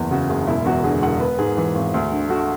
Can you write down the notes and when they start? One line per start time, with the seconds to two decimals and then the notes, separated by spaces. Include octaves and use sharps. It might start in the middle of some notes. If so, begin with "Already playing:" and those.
Already playing: F#1 E2
0.11 C#3 F#4
0.29 F#1 G#4
0.47 E1 E4
0.65 E2 F#4
0.84 D3 G#4
1.02 E1 F#5
1.20 B3 B4
1.39 G#2 G#4
1.57 E3
1.75 G#1
1.94 D2
2.12 D3
2.29 A3 F#4